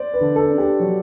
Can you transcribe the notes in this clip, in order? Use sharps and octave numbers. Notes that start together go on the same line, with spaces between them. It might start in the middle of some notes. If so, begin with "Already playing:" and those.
Already playing: C5 D5
B4
D3
A4
D4
G4
F#3